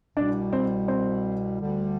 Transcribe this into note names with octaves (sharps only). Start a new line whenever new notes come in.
C2 B2 G3 D4 D5
C4 C5
C4 C5
D2 D3 G3